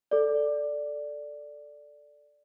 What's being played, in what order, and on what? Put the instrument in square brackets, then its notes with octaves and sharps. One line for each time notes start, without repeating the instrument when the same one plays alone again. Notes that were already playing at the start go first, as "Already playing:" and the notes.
[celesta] A4 D5